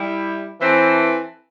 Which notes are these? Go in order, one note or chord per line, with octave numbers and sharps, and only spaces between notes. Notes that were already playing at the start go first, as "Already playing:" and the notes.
Already playing: G3 E4 G4
E3 C4 A4